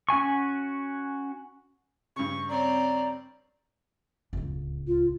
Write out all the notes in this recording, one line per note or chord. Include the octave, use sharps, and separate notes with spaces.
C#4 F#4 G#5 C#6
G2 C#3 C#6
C4 C#5 D5 A#5
D1 C#2
F4